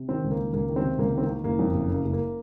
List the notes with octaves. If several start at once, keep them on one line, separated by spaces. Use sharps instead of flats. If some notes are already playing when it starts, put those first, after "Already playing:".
Already playing: C3
D#3 C4
C#2
A#3
D#3
C#2 A#3
D#3
C4
C3
C#2 A#3
D#3 C4
A#3
D#3
F#1 A#3
F2
F#1
C#3 A#3
F#1
A#3